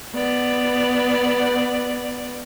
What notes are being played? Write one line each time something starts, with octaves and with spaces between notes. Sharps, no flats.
B3 D5